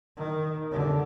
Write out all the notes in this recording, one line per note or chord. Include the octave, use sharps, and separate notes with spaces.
D#3
D3